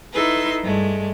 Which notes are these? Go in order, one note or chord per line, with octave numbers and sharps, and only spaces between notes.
D#4 E4 A4 B4 C6
G2 G#3 A3